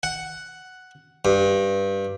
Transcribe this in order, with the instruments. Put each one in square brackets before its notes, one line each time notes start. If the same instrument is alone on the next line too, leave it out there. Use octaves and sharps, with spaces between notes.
[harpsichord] F#5
G2